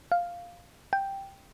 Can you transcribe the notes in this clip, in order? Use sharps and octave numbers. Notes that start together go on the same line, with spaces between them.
F5
G5